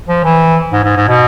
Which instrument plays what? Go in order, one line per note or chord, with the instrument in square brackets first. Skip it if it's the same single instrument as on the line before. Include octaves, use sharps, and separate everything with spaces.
[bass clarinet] F3
E3
G#2
G#2
G#2
B2